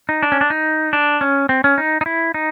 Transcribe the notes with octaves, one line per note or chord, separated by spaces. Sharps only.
D#4
D4
C#4
D4
D#4
D4
C#4
C4
C#4
D#4
D#4
E4
D#4